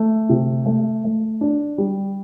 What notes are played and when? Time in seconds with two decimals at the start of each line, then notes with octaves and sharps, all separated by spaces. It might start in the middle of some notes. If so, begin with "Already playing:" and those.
Already playing: A3
0.29 C3
0.66 A3
1.04 A3
1.41 D4
1.78 G3